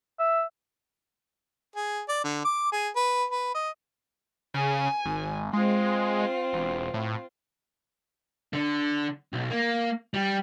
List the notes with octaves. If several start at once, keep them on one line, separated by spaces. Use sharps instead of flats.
E5
G#4
D5
D3
D6
G#4
B4
B4
D#5
C#3 G#5
G#1
G#3 C4 F4
E1
A2
D3
B1
A#3
G3